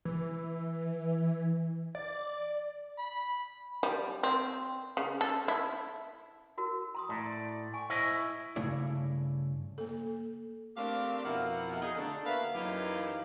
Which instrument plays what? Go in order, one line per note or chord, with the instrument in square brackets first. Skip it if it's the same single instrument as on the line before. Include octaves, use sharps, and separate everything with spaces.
[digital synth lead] E3
D5
[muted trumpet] B5
[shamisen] G3
C4
C#3
A4
E4
[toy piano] E4 F#4 A#4
A#5 C6 D#6
[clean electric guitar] A2 [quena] D5
[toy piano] G#5 [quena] C#6
[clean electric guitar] E4 D#5 [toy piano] C5
[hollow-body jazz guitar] G2 C#3 A3 E4 C#5 D5
[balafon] A#3 A4
[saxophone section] A3 C4 D4 G4 A#4 F5
F2 B2 E4 A#4 F5 F#5
D#4 G#4
D3 A3 D4 A4
A#3 B3 F#4 B4 E5 F5
F#2 E3 D#4 G4 F5